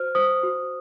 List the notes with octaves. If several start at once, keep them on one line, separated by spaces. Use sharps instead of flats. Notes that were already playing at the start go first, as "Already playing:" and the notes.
Already playing: F#4 C5 F6
C5 D#6
F#4